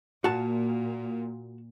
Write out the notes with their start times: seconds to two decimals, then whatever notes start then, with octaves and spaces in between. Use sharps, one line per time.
0.24 A#2 F#4 A5